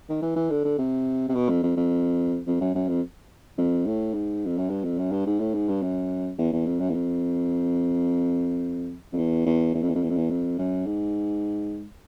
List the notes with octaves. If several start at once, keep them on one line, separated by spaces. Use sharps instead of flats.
D#3
E3
E3
D3
D3
C3
C3
B2
F2
F2
F2
F2
F#2
F#2
F2
F2
A2
G#2
F2
F#2
G2
F2
F#2
G2
G#2
A2
G#2
G2
F#2
E2
E2
F2
F#2
E2
F2
F2
E2
E2
E2
F2
E2
F2
E2
F2
E2
F2
F#2
G#2